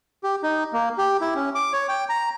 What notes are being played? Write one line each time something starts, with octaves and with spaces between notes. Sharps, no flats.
G4
D#4
A#3
G4
E4
C#4
D6
C#5
G5
A#5